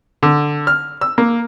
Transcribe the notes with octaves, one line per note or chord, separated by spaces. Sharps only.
D3
F6
E6
A#3